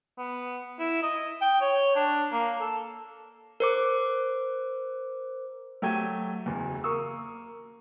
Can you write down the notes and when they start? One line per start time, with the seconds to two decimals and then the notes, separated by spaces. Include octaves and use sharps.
0.18 B3
0.79 E4
1.03 D#5
1.41 G5
1.61 C#5
1.95 D4
2.32 A#3
2.60 A4
3.60 A#4 C5 D6
5.82 F#3 A3 G4 G5 G#6 D#7
6.46 F#1 E2
6.84 A#3 C#6 D#6 E6